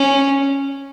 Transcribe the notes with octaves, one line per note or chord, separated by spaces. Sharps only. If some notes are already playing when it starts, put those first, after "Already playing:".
Already playing: C#4